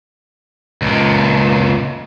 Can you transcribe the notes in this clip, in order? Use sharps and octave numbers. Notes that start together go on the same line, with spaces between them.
C#2 A#2